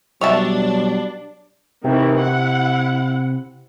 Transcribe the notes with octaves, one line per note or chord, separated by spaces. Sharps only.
B2 F#3 G3 D4 C#5 E5 A5
C3 D#3 E3 C4
E4 F#5